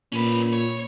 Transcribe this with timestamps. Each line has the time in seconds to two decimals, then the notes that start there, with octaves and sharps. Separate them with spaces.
0.12 A#2 C#4 B4
0.53 C#5